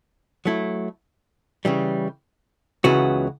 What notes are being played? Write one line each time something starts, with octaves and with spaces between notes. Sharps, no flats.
F#3 A3 E4
C#3 E3 G3
C#2 C#3 E3 B3 F#4